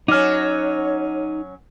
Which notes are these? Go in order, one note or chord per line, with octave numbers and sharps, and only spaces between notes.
F#3 C#4 D#4 C#5 D6 F6